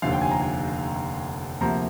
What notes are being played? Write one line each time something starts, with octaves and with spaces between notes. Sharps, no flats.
F1 D#2 D3 F3 F5
G5
G#5
A#5
G#5
D2 C3 F3 A#3 A#5